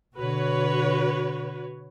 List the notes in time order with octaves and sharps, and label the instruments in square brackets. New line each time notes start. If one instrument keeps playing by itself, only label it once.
[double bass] B2 D3 [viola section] F#4 B4 C#5